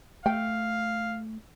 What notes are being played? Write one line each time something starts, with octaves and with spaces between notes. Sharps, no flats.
A3 F5 G5